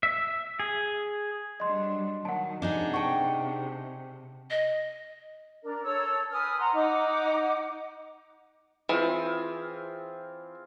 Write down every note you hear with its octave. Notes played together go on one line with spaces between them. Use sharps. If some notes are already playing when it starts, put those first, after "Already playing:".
E5
G#4
F#3 G3 D4 D#5 C6
D#3 F#3 F#5 A5
C3 D4 D#4 G#4
F#5 G5 A5 C#6
D#5
D4 A#4
A4 C#5 E6
B4 G#5 D#6 F6
F#5 A#5 C6
D#4 F#5 D6
E3 C4 F4 G#4